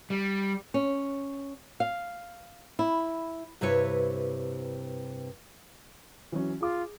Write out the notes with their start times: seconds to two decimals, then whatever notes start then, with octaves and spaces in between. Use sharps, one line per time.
0.10 G3
0.74 C#4
1.80 F5
2.79 E4
3.61 G2 C3 E4 B4 C#5
6.32 E3 F#3 C#4
6.61 F4 G#4 D6